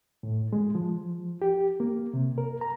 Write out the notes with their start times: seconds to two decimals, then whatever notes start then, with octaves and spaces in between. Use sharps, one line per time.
0.23 A2
0.53 G#3
0.75 F3
1.42 G4
1.80 A#3
2.14 C3
2.38 A#4
2.61 A#5